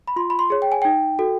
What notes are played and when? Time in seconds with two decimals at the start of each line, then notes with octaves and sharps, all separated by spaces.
0.08 B5
0.16 F4 C6
0.30 B5
0.39 C6
0.50 G#4 C#5
0.62 G5
0.72 G#5
0.82 D#4 G5
1.19 F#4 A4